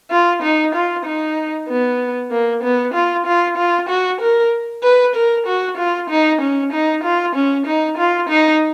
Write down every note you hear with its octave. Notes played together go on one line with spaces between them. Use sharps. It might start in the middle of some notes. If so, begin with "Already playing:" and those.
F4
D#4
F4
D#4
B3
A#3
B3
F4
F4
F4
F#4
A#4
B4
A#4
F#4
F4
D#4
C#4
D#4
F4
C#4
D#4
F4
D#4